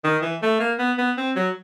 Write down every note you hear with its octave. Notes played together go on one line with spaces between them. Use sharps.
D#3
E3
A3
A#3
B3
B3
C4
F#3